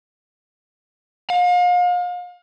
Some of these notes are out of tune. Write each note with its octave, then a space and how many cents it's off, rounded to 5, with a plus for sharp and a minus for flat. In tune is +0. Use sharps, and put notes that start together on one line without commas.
F5 +40